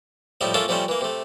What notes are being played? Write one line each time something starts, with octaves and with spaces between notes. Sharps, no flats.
A2 F3 G3 D#4 E4
A3 A#3 C#4 E4 F4 A4
C3 F3 G3 A3 C4 C#4
E3 A#3
C3 A3